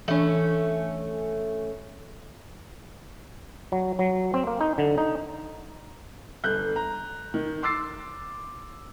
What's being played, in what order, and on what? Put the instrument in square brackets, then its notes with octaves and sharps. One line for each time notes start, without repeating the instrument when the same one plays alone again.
[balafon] E3 D4 [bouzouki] A3 C#4
[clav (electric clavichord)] F#3
F#3
C4
A#3
D#4
D3
D#4
[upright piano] G1 F#6 G6
A#5
D#3
C6 D6 E6 A6 C7